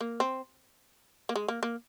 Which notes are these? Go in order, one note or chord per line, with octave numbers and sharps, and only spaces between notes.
A#3
C4
A#3
G#3
A#3
A#3